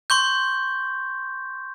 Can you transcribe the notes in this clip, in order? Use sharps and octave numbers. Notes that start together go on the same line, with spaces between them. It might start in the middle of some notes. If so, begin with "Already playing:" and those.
C6 C#6 G6